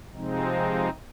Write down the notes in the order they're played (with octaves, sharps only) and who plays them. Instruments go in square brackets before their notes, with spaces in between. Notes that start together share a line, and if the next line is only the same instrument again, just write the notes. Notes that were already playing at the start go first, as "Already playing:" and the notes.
[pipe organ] C3 F3 G#3 C4 D#4